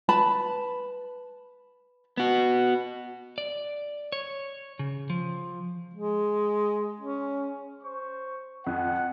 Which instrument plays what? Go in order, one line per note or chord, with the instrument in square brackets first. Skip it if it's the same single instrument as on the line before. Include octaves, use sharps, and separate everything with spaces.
[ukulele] B4 A5 B5
[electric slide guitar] B3 F#4
[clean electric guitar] D5
C#5
C#3
F3
[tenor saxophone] G#3
C#4
[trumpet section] C5 C#6
[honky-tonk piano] F2 [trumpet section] F#5